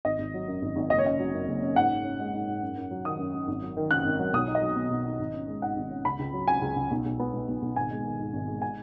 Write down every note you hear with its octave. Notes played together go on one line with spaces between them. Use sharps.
G#1 D#5
G#1
F#3
F#2
G#1
G#1
F#1 D#5
C#5
C#4 D#5
F#3
F#2
F#1
C#4
G#2 F#5
G#2
C#4
G#3
G#2
G#2
F#2
F#2
F#3
D#3 D#6
F#2
F#2
G#1
F#3
D#3
F#2 F#6
G#1
F#3
B1 D#6
D#4
D#5
F#3
B2
B1
D#4
G#1
C#4
G#3
G#2 F#5
G#1
C#4
C#2 B5
C#2
F#3
C#3 G#5
C#2
C#2
B1
B1
B3
B2
B1
B1
G#1 G#5
G#3
D#3
G#2
G#1
G#3
G#5